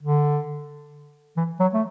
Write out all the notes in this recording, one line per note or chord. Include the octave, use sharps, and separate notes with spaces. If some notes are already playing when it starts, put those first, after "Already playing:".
D3
E3
F#3
A3